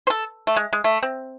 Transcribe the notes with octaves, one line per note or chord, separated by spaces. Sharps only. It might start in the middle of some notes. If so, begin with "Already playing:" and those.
C5
A4
A3
G#3
G#3
A3
C4